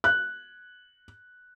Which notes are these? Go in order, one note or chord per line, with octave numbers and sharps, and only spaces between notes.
F#6